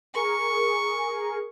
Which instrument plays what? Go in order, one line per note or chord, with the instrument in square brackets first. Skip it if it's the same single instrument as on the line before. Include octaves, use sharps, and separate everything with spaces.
[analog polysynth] G#4 A#4 [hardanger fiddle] C#6